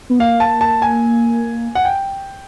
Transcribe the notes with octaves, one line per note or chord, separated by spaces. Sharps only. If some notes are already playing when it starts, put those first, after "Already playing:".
B3
A#3 F5
A5
A5
G#5
F#5
G5